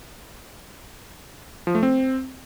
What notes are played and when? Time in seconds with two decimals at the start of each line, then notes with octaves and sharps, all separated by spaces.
1.67 F3
1.75 A3
1.83 C4